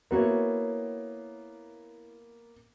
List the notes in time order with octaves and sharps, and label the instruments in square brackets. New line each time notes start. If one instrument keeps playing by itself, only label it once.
[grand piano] A#3 B3 [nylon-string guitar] E4 F#4 C#5